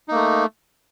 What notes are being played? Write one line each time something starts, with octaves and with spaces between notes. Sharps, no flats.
A3 A#3 D#4